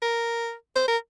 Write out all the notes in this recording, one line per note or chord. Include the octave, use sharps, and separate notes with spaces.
A#4
C5
A#4